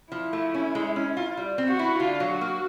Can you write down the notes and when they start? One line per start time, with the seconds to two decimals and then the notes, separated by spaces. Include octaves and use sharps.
0.12 F3 E4
0.33 A3
0.54 C#4
0.75 G#3
0.96 C#4
1.17 F4
1.37 G3
1.58 C4
1.69 F#4
1.79 E4
1.99 D3 F4
2.20 F#3
2.31 F#4
2.41 A#3